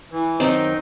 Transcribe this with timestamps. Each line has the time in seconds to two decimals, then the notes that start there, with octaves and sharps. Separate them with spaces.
0.12 E3
0.40 F#2 D#3 C4 D#4